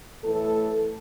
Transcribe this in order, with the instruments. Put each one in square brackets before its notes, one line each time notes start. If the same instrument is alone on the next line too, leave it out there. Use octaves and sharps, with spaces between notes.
[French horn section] A2 E3 A3 A4